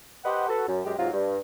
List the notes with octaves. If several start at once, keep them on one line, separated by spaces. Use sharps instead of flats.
G4 B4 C5 D#5 F#5
F#4 A4 B4
F#2
F#2 G#3 G4
G#2 C3 F#3 F4
G2